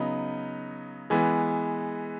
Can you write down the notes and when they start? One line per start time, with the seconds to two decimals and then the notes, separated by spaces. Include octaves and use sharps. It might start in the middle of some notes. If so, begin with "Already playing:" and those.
Already playing: C#3 F#3 B3 D#4
1.10 E3 G#3 B3